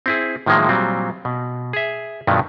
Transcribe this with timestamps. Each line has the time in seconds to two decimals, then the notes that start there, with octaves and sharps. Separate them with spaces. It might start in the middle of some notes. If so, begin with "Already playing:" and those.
0.06 C4 E4 G#4
0.46 A2 D#3 F3 F#3 G#3 A#3
0.69 A#2 F#3 G3 C4
1.25 B2
1.73 G#4 E5
2.27 G2 B2 D#3 F3 F#3 A3